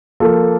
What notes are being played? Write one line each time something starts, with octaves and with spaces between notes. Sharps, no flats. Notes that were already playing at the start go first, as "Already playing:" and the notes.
F3 A#3 F4 A4